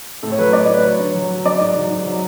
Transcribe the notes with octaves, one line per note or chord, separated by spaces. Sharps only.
A2 A4
C#5
F#3 B4
A2 D5
A2
B4
F#3 C#5
D3
F#3
F#3
F#3 D5
G#2
F#3
G#2
F#3